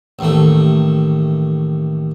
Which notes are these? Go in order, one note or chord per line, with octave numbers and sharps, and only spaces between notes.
A1 D#2 A3